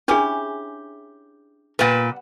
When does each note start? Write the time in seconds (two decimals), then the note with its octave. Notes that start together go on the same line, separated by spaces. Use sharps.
0.08 C#4 D4 E4 G4 G#4
1.79 A#2 G3 B3 B4 F#5